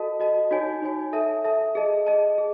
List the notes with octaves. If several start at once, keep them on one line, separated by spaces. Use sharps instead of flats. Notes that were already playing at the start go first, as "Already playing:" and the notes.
Already playing: F#4 A4 D#5 A5
F#4 A4 D#5 A5
D#4 F#4 C#5 G#5
D#4 F#4 C#5 G#5
A4 E5 A5
A4 E5 A5
G#4 D#5 A5
G#4 D#5 A5
G#4